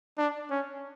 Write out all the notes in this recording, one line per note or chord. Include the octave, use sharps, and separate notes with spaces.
D4
C#4